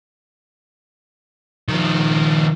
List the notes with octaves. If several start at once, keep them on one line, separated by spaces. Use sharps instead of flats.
D#3 F3